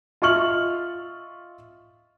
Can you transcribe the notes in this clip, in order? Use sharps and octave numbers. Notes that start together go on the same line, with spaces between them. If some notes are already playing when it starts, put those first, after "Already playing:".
F4 D#5 E5 C#6 F6 F#7